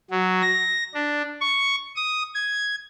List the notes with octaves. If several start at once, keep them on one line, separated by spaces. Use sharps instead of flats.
F#3
A#6
D4
C#6
D#6
G#6